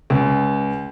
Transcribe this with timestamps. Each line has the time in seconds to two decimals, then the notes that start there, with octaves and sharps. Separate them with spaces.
0.10 C#2